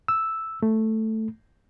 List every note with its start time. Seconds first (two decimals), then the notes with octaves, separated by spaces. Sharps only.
0.08 E6
0.63 A3